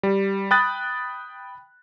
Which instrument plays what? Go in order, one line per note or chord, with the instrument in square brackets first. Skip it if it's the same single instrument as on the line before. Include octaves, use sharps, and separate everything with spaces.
[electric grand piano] G3
G5 B5 D#6 F#6 A6